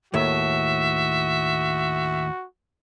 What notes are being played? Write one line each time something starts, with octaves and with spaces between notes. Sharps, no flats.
D#2 A2 A3 F#4 E5